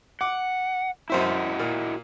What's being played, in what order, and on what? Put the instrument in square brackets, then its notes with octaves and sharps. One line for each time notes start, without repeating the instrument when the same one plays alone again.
[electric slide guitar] F#5 [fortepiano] D6
[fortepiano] F#2 C5 E5 [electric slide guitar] E4 F#4 D#5
[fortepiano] A#2